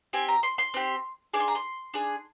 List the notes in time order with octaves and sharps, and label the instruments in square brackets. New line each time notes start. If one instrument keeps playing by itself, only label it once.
[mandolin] C4 G4 G#5
A#5
C6
C6
C4 G4
D4 G#4 D6
C6
A#5
C6
D4 G#4